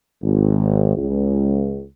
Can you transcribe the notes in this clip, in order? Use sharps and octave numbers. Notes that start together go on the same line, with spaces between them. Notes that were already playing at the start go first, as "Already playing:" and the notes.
G#1
C#2